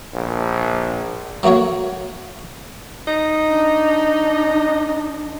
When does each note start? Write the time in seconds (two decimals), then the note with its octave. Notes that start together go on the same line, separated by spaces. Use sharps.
0.14 A#1
1.43 F#3 A3 A#3 F#4 C#5
3.07 D#4
3.48 D4